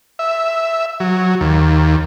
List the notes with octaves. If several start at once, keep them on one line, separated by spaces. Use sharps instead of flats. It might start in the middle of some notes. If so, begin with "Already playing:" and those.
E5
F#3
D#2